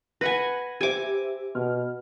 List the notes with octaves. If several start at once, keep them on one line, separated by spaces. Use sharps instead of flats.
B4 F#5 G#5 A#6
G4 C5 E5 G#5 D6
B2 F6